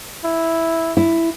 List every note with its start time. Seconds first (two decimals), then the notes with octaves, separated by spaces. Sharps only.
0.25 E4
0.97 E4